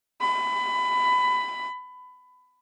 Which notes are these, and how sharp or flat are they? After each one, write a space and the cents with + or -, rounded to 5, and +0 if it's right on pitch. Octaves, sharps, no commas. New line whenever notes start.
B5 +20